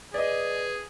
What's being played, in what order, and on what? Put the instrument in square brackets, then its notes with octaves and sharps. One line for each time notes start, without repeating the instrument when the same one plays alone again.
[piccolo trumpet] G#4 [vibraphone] B4 [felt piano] D5 D#5